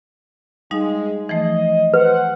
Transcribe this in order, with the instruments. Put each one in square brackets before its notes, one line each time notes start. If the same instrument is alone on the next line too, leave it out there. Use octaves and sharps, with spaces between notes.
[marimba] G3 D#4 F5 [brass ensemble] G#3
[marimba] E3 F3 A3 [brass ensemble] D#5
[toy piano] B4 [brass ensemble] C5 F#5